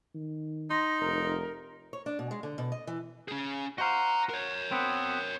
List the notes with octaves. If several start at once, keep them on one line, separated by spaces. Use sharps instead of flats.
D#3
D#4 C6 A#6
F1 A#4
C#5
D4
B2
G#3
D3
B2
D#5
E3
C#4 G#4
F#4 C5 D#5 F5 A#5
A#4 C#5
B3 C4